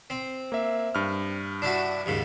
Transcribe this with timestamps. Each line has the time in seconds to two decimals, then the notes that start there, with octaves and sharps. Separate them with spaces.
0.10 C4
0.52 A#3 E5
0.95 G2 F6
1.62 D4 E4 F#4
2.06 D#2 G#2 C#3